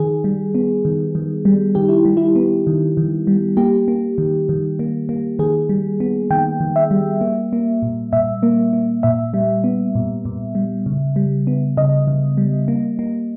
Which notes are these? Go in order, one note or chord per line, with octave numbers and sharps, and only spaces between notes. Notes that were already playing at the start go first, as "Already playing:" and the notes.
Already playing: D#3 G#4
G3
B3
D#3
D#3
G3
D#3 G4
E4
G3
E4
B3
D#3
D#3
G3
A#3 G4
A#3
D#3
D#3
A#3
A#3
D#3 G#4
G3
B3
D#3 G5
D#3
E5
G3
A#3
A#3
A#2
A#2 E5
A#3
A#3
A#2 E5
G3
B3
A#2
A#2
G3
C#3
G3
B3
C#3 D#5
C#3
G3
A#3
A#3